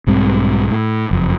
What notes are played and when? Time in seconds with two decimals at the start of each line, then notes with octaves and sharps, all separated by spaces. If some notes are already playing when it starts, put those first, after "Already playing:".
0.07 B1 G#2 G3 C4
0.71 A2
1.11 F#1 F2